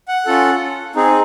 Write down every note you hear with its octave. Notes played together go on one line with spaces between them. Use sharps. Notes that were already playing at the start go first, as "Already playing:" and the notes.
F#5
C#4 F4 A4
C4 D#4 G#4